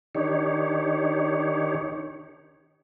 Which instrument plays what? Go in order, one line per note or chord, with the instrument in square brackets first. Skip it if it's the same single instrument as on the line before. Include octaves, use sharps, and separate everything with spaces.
[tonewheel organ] D#3 D4 D#4 G4 C#5